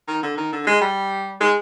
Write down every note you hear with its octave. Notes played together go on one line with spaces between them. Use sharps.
D#3
D3
D#3
D3
G#3
G3
G#3